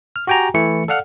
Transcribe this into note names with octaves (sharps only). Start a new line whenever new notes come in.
F6
F#4 G4 G5 G#5 A#5
E3 A3 E4 C#7
A4 D5 F5 F#5 F6